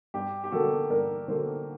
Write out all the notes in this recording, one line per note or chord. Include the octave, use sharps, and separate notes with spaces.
G2 G4
G4
D3 F#3 A#3 F#4 A4
G2 A#4 D5
D3 F#3 A#3 A4 C5